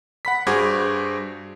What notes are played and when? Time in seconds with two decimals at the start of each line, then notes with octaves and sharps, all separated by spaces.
0.25 F#5 B5 B6
0.47 G2 F#4 G#4 C5 D6 G#6